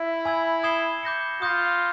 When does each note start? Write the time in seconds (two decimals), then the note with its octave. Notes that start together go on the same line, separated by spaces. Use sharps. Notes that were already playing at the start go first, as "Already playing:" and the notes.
Already playing: E4
0.25 G#5 B5 E6 G#6
0.64 D#6 G#6 C7 E7 G7
1.03 D6 G6 A#6 C#7
1.42 F4 D#6 G6 A#6